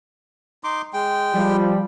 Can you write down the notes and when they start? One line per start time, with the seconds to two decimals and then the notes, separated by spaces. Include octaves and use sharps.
0.64 D#4 C6 D6
0.93 G#3 G5
1.34 F3 G3